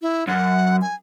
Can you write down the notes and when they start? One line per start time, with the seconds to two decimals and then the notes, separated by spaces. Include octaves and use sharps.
0.02 E4
0.27 F#2 F#5
0.81 G#5